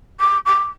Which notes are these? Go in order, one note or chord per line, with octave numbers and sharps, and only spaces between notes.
D6
D6